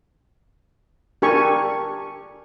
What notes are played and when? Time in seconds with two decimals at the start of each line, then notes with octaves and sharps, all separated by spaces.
1.22 D4 G4 A#4 G#5 C#6